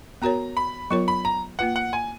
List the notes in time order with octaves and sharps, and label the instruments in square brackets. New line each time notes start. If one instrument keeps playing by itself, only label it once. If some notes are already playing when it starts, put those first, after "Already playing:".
[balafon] B3 F#4 A#4 C#5 [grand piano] A#5
[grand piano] B5
[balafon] F#3 B3 F4 A#4 C#5 [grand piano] C#6
[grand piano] B5
A#5
[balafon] A#3 F4 B4 [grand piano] F#5
[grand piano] F#5
G#5